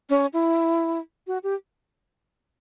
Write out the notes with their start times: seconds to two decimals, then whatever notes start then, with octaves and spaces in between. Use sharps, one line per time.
0.10 C#4
0.33 E4
1.27 F#4
1.43 G4